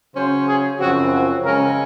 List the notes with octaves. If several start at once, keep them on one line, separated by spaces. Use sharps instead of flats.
C#3 F#3 C#4 C5
G#4
F#2 C#3 F3 C4 F#4
F#4
C#3 G#3 C#4 A#4